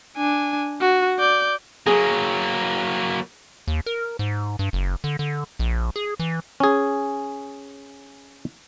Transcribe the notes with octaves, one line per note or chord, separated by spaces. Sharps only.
D4 G#5
F#4
D5 G6
F#3 A#3 G#4
D#2
A#4
G#2
G2
F#1
D3
D3
A#1
G#4
E3
C#4 G#4